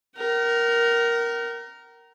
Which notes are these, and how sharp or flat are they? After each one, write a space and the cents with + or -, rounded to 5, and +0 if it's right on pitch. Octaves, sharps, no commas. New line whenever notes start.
A#4 +5 G5 -45